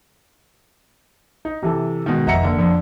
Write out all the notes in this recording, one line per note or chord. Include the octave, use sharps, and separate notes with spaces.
D#4
C3 E3 A4
G#2 B2 D#3
F1 D#5 E5 F#5 A#5 C#7
D3 A#3
F2 D3